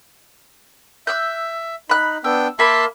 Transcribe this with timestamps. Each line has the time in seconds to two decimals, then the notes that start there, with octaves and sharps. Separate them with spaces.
1.07 E5 E6 F#6 G6
1.89 D#4 B5 F#6
2.24 B3 D4 G5 E6
2.59 A#3 E5 A5 B5 C6